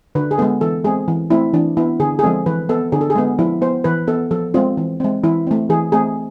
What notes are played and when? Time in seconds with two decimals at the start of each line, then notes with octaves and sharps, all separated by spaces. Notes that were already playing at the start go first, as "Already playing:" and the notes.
0.15 D3 B4
0.31 G#4
0.38 G#3 B3 A4
0.61 E3 A4
0.84 G#3 C4 G#4
1.08 E3
1.31 A3 C4 E4
1.54 E3 D4
1.77 B3 E4
2.00 D3 G#4
2.19 G#4
2.23 F3 G#3 C4 A4
2.46 E3 B4
2.69 B3 A4
2.92 D3 G#4
3.01 A4
3.10 G#4
3.15 G#3 B3
3.39 F3 E4
3.62 B3 C5
3.84 E3 B4
4.07 B3 A4
4.31 F3 A4
4.54 G#3 C4 F4
4.77 E3
5.00 G#3 C4
5.24 E3 E4
5.47 A3 C4
5.70 E3 G#4
5.92 A3 C4 G#4